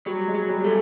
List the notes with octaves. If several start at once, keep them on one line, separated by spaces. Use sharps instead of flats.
F#3 G3
G#3
F#3
G3
G3 A3